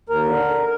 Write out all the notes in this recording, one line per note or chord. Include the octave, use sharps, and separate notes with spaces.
D#2 A#4
D3